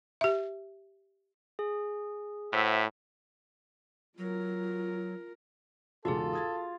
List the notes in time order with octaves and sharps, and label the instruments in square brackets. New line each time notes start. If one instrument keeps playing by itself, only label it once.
[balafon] G4 E5
[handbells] G#4
[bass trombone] A2 [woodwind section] F#4 C5 E5
[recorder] F#3 [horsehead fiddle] F4 A#4
[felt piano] E2 G#2 C#3 [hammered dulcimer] F4 F5 [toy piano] F#4 G#4 [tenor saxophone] A4
[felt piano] D#6 G#6 A6